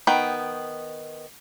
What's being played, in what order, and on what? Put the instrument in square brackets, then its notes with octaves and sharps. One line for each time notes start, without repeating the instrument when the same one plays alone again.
[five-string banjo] D#3 B3 G5